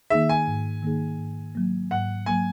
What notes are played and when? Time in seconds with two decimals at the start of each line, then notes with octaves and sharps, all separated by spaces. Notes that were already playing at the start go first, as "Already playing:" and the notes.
0.10 D#3 A#3 D#4 G#4 E5
0.29 G#5
0.47 G#2
0.83 D#3 A#3 D#4 G#4
1.19 G#2
1.55 F#3 A#3
1.91 G#2 F#5
2.26 F#3 A#3 G#5